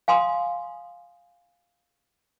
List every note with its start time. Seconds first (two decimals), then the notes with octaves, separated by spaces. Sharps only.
0.08 F5 G#5 C6 D#6